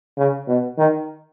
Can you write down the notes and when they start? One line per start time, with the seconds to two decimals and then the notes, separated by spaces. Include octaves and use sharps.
0.17 C#3
0.47 B2
0.78 D#3